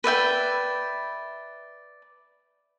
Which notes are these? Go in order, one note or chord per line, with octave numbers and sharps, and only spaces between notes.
B4 D5 E5 G5